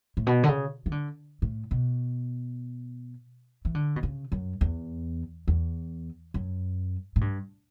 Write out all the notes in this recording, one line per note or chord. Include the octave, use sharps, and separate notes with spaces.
A2
B2
D3
C#3
E3
D3
A2
B2
E3
D3
B2
C#3
F#2
E2
E2
F#2
A2
G2